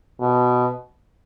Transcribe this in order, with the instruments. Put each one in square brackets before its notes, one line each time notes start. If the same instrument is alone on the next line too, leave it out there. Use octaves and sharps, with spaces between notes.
[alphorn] B2